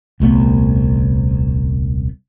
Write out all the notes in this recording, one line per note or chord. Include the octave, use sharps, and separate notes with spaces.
D#1 C2 A3 B3